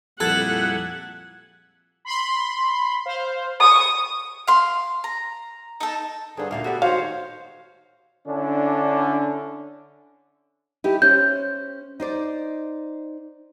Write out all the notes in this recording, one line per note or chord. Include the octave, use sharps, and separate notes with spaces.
F2 A#2 G3 E4 G#4 A4 F#5
B5 C6
C5 F5
C#6 D#6
F5 C6
A#5
D#4 A4
G2 D3 C4 D#4 G#4
D2 A#2 D3 F5
B3 F#4 G4 A4 D5
D#3 G#3 F#4 C5 C#5 F5
D3 C#4 D4 E4
D#4 E4 G4
C#4 C5 G6
D#4 C5 D5